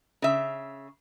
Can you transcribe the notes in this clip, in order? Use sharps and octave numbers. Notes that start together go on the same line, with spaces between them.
C#3 E5